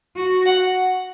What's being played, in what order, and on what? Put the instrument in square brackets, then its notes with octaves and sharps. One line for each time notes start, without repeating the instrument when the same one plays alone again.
[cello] F#4
[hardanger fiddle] F#5